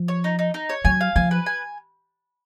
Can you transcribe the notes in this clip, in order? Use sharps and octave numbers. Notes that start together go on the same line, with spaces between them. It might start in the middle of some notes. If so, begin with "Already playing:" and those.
Already playing: F3
C#5
D#4
D#4
D#4
C#5
F#3 G#5
F5
F3 G#5
B4
G#5